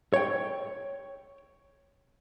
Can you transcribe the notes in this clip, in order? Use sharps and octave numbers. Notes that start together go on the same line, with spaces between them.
C#5 G5